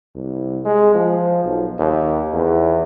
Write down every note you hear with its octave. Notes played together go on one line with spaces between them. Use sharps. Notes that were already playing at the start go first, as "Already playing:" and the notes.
C2
G#3
F3
B1
D#2
E2